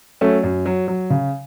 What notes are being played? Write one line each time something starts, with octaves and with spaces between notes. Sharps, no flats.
F#3 A3 C#4
F#2
F#3
F#3
C#3